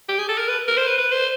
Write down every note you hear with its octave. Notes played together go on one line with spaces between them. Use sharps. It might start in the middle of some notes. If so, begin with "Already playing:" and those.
G4
G#4
A4
A#4
B4
A#4
C5
B4
B4
C5